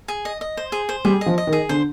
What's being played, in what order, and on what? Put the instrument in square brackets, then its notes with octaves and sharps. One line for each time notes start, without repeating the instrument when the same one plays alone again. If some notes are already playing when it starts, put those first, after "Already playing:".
[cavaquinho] G#4
D#5
D#5
C5
G#4
C5
[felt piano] G3 [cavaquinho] G#4
[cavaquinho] D#5
[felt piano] F3
[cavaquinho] D#5
[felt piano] D#3
[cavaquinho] G#4
[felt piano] D3 [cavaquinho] C5